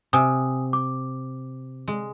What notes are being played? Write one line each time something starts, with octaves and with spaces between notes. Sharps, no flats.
C3 G#5 D#6
D6
G#3